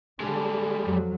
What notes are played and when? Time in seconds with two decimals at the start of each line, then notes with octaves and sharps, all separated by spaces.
0.20 D3 G3 G#3 A4 D5 G#5
0.83 F2 F3 F#3